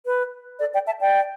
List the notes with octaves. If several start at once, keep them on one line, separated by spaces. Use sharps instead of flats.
B4
A4 D5
D5 G5
E5 A5
D5 G5